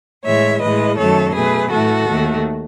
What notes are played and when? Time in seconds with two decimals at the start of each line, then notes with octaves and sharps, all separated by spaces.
0.25 A2 E3 G#3 C#5 E5
0.61 A2 E3 G#3 B4 D#5
0.98 F#2 D#3 F#3 A3 A4 C#5
1.34 B2 A3 G#4 B4
1.70 A2 E3 A3 F#4 A4
2.07 D#2 D#3 A3